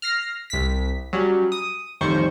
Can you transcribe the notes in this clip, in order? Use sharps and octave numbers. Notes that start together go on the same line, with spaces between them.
F6 A#6 C7
C2 B6
F#3 G3 C#4
D#6
A1 F2 D#3 G3 C5 C#6